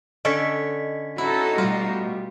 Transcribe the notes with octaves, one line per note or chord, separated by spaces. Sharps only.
D3 C#4 A4 D#5 B6
C#4 D#4 E4 F#4 A4
B2 G3 A3 F4